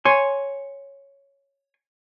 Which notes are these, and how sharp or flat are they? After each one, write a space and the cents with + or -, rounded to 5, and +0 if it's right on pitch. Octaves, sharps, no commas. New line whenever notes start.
C#5 +0 G#5 +0 C6 +0